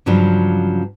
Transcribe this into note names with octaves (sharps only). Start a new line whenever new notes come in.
G2 C#3 F3 F#3 D4